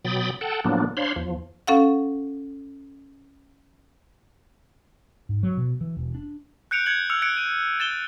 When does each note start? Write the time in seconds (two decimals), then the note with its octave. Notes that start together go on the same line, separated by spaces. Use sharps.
0.05 B2 F#3 G5 B5 D#6 A6
0.41 A4 F#5 G5 A5
0.65 A2 F3 F#3 A#3 B3 D4
0.97 D4 C5 C#5 F5 B5 C6
1.16 E2 F3
1.67 C#4 A4 F5 F#5
5.29 G#2
5.43 F#3
5.57 B2
5.81 E3
5.97 E1
6.15 D4
6.71 F#6 G6 C#7 D7 F7
6.86 G6 G#6 C#7 F#7
7.10 E6 F6 C#7 F7
7.22 F#6 G#6 C#7 D7
7.37 D#7
7.80 A6 E7 G7